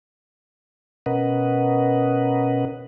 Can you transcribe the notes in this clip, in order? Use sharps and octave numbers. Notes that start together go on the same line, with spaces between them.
B2 C#4 A#4 B4 D#5 F#5